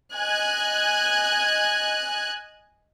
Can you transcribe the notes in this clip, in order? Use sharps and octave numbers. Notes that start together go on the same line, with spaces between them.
D#5 G#5 F#6 G#6